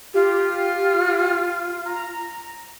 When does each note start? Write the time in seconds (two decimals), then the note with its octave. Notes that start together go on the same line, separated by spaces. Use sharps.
0.14 F4 G4
1.86 A#5